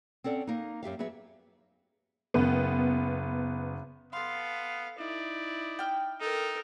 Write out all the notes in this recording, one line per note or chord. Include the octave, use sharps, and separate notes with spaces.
C4 C#4 A4 D5 F#5
A#3 D#4
F#2 G4 E5 F5
F#3 B3 G#4 E5
F#1 B3
B3 A4 F5 C6
D#4 E4 D5
G5 F6
D#4 A4 A#4